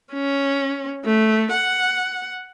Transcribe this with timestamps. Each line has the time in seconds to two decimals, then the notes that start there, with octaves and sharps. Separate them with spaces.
0.14 C#4
1.05 A3
1.52 F#5